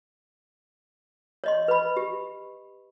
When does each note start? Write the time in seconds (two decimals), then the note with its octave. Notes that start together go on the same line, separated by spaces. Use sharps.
1.44 C#5 D#5 C6
1.68 B4 B5
1.97 G4